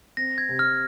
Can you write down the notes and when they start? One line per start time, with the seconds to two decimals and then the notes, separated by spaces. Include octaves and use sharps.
0.17 C4 A#6
0.38 G#6
0.49 C3
0.59 F6